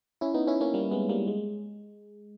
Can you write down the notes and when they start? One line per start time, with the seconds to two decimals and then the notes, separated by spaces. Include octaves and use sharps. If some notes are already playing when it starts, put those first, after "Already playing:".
0.21 C#4 E4
0.34 B3 D#4
0.47 C#4 E4
0.61 A#3 C#4
0.74 G3 A#3
0.91 G#3 B3
1.09 G3 A#3
1.27 G#3